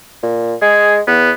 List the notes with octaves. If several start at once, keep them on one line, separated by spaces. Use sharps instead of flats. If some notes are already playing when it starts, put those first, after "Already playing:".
A#2
G#3 G#4
E2 B3